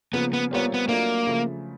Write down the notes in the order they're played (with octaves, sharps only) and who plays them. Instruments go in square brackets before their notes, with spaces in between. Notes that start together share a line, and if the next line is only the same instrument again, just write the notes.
[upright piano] C#3 F3 A#3 [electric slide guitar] B3
[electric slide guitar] B3
[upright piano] G3 C4 F4 A#4 C#5 [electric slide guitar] B3
[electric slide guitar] B3
[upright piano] F#3 A3 D4 F4 A#4 [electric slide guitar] A#3
[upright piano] C#3 F3 A3